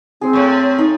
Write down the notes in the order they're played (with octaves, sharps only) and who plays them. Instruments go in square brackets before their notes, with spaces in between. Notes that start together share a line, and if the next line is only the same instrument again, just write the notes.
[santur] G#3 G#4 [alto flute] C4
[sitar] A2 F3 [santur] C#6
[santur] D#4